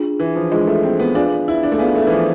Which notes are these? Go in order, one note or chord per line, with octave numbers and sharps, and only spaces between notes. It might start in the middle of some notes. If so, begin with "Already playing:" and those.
Already playing: D4 F4 G#4
E3
F3
G#3 D4 F4 G#4
A3
C4
B3
D4 F4 G#4 B4 F5 G#5
E4
D4
A3
B3 F4 G#4 B4 F5 G#5
A3
E3
F3